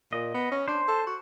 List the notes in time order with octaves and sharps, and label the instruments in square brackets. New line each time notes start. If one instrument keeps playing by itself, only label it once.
[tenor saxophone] A#2 [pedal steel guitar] D#5
[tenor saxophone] B3
C#4
[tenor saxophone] D4 [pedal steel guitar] C5
[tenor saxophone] A4
F#4